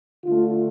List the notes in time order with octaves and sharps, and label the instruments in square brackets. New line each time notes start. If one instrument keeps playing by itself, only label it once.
[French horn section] D3 A3 F4